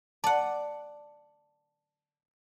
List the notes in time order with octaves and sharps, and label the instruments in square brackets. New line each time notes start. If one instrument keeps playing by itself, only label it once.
[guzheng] D5 F#5 [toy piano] A5